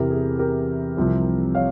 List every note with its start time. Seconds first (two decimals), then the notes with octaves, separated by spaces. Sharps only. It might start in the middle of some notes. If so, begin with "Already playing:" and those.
Already playing: E2 C3 E3 G4 A#4
0.10 G#4
0.39 G4 A#4
0.97 C2 C3 F3
1.55 C#5 F5